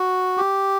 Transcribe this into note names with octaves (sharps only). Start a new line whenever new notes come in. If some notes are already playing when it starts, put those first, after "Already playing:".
Already playing: F#4
G4